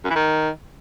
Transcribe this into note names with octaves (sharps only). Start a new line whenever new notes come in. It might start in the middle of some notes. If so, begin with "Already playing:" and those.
F#2
E3
D#3